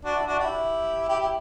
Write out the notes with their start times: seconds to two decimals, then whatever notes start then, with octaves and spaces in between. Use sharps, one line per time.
0.04 D4 F#4
0.16 E4
0.27 D4 F#4
0.39 E4 G4
1.08 E4 G4
1.20 E4 G4